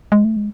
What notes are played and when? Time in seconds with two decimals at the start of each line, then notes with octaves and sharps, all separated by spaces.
0.12 G#3
0.25 A3
0.37 G#3